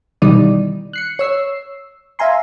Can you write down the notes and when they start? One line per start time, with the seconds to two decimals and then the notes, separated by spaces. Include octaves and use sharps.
0.22 B2 D#3 E3 G3 D#4 D5
0.93 F#6 C7 C#7
1.19 C#5 E6 C7
2.19 E5 F5 G#5 A#5 C6